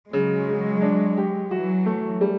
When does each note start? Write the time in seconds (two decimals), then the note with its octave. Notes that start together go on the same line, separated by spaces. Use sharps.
0.13 C#3 F#3 G#3
0.48 C#3
0.82 D4
1.17 G4
1.51 E3 F#3 F#4
1.86 A3
2.21 G3